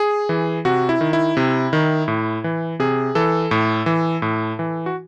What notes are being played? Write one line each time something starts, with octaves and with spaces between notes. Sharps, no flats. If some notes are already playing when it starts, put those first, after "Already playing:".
Already playing: G#4
E3
C3 F#4
E4
D#3
E4
C3
D#3
A2
E3
C3 G#4
E3 A4
A2
E3
A2
E3
F#4